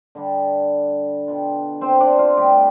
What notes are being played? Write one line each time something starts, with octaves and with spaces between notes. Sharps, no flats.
D3 G3 D4
B2 G3 D4 F4
C4 C5
D4 D5
F4
A2 G3 B3 G4